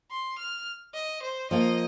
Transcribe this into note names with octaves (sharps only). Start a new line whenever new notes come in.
C6
F6
D#5
C5
F3 A#3 F4 D#5